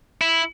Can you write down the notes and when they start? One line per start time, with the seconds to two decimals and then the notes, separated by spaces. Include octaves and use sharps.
0.21 E4